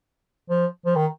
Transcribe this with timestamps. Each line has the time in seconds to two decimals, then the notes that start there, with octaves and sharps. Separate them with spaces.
0.50 F3
0.86 F3
0.96 D#3